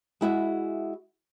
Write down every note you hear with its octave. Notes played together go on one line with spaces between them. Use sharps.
G#3 E4 F#4 E5